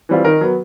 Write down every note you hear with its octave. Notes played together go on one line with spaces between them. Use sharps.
E3 G3 C4 F4
D#3 A#4
F#3 B3